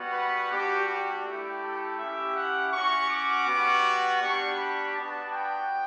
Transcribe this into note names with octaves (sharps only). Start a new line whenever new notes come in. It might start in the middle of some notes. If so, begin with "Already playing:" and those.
Already playing: G3 B3 F#4
B4
G3 D4 F#4 G4
G4
A3 E4 G4
A4
C#4 E4 G4 E5
F#5
C#4 F#4 C#6
D6
G3 B3 F#4
G3 D4 G4 C#6
B5
B3 D4 F#4 A5
G5